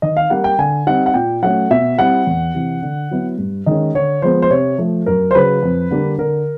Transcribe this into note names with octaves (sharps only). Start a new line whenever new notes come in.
D#3 D#5
F5
G3 A#3 F#5
G5
D3 G#5
G3 C4 D#4 F#5
F#5
A#2 G5
F#3 A3 C#4 F#5
B2 E5
G3 C4 E4 F#5
E2
C3 E3
D3
F#3 B3 E4
G2
D#3 G#3 C#4 D#5
D3 C#5
F3 G#3 B3 C5
C5
C3 C#5
F3 A3
F#2 A#4
C5
C#3 F#3 B4
F2
D3 G3 A#3 D4
D3 A#4